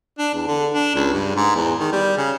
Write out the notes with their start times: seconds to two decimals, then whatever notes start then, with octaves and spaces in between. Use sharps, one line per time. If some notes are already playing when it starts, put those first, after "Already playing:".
0.19 D4
0.34 E2
0.47 D3
0.72 D4
0.95 C#2
1.13 G2
1.36 G#2
1.55 E2
1.79 D#3
1.92 G3
2.17 C#3